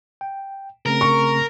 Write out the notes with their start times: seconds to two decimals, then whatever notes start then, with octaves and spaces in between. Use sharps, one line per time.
0.21 G5
0.86 C#3 A3 C4 A#4
1.01 C#6